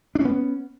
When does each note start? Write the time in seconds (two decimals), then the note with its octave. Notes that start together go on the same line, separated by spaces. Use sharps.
0.15 D4
0.20 C#4
0.25 B3